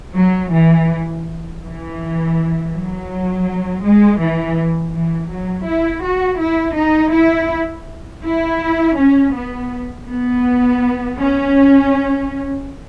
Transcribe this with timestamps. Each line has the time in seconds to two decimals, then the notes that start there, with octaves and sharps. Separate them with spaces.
0.15 F#3
0.53 E3
1.63 E3
2.73 F#3
3.84 G#3
4.20 E3
4.94 E3
5.30 F#3
5.67 E4
6.05 F#4
6.41 E4
6.77 D#4
7.15 E4
8.24 E4
8.98 C#4
9.35 B3
10.09 B3
11.18 C#4